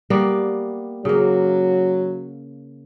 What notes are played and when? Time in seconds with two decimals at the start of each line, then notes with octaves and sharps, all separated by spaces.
0.10 G3 A#3 B3
1.05 C#3 F#3 A#3